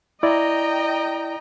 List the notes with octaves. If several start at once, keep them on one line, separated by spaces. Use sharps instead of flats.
E4 D5 D#5 G5 A#5